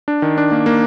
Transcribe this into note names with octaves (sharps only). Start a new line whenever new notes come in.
D4
D#3
D4
A#3
A#3